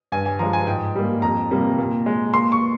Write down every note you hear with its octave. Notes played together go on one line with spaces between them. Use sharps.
G2 G#5
G#5
F3 G#3 A#5
G#5
G#2 G5
G3 A#3
F2 A#5
C3 G3 A#3
A#2
G#3
A#2 C6
C#6